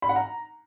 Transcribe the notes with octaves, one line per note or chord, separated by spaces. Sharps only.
B5
F#5
A#5